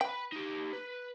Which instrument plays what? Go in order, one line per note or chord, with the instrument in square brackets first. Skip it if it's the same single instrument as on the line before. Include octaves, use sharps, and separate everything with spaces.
[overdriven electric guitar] B4 B5 [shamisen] G5
[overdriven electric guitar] D#4 G4
B4